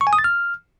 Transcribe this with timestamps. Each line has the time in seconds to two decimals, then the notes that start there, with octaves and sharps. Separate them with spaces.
0.01 C#6
0.07 G#5
0.13 D#6
0.19 A6
0.24 F6